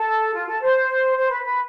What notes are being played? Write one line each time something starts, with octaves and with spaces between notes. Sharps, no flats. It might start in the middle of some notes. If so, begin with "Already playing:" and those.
Already playing: A4
F4
A4
C5
C5
B4
B4